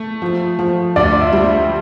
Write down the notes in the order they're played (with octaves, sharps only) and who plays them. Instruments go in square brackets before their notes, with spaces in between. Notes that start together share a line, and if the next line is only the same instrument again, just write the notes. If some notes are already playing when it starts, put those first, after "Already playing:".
Already playing: [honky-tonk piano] A3
F3
F3
[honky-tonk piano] D2 [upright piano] D5
[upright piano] E5
[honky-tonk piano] G3
[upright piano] E5